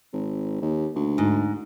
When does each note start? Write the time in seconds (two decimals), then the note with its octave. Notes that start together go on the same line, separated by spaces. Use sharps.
0.13 G#1
0.62 D#2
0.95 D2
1.18 G#2